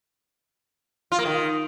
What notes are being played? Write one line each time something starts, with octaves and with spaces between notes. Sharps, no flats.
F4
A#3
D#3